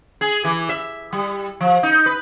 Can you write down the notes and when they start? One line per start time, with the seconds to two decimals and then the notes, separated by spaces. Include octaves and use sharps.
0.21 G#4
0.45 E3
0.69 E5
1.13 G3
1.61 F3
1.83 D#4
2.06 B4